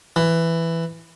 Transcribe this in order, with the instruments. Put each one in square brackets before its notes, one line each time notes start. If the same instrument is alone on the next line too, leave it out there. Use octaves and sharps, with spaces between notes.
[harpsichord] E3